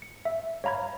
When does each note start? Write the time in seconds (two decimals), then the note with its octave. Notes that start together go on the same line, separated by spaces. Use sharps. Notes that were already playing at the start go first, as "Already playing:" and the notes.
0.02 C#7
0.25 E5
0.64 C#5 F5 A#5 B5 G#6